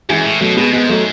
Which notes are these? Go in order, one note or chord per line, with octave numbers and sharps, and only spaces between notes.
F#2 E3 G#3
A2
B2 F#3 A3
B2 G#3 B3
G#2 G#3 B3
F#3 A3